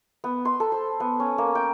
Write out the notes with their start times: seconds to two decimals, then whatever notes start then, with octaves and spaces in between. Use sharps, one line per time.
0.24 B3
0.45 C6
0.60 A4
0.72 C5
1.00 B3
1.20 C#4
1.38 A#3
1.55 G5